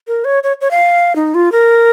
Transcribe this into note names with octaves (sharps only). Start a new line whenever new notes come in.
A#4
C#5
C#5
C#5
F5
D#4
F4
A#4